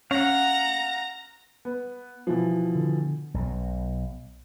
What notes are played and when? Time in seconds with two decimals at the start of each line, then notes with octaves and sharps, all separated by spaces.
0.11 C#4 F5 F#5 A#5
1.65 B3
2.27 B2 E3 F3
2.75 D3
3.34 B1 B2